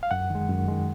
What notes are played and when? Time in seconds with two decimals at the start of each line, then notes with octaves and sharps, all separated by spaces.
0.03 F5
0.11 F#2 F#5
0.30 D#3 G#3
0.49 F#2
0.68 D#3 G#3